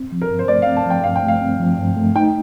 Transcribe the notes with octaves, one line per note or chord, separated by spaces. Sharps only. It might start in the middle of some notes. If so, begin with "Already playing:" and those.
Already playing: C4
F3
A#4
G2
C5
A3 D5
F5
C4
A5
F3 G5
G2 F5
G5
A3
F5
C4
F3
G2
A3
D#4 G5